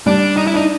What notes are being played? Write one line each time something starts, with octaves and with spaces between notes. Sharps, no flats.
G3 D4
D#4
E4
D4 D#4